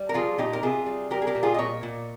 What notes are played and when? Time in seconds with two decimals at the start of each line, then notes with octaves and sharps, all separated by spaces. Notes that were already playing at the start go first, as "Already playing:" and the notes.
Already playing: G3
0.09 A#4
0.14 F3 F4 G#4
0.38 A#2 D#4 G4
0.53 A#4
0.63 C3 F4 G#4
0.86 G3
1.10 G3 G4 A#4
1.22 G#4
1.27 G4 A#4
1.35 A#2
1.43 F4 G#4
1.54 D#5
1.58 A#2 A#4 C#5
1.83 A#2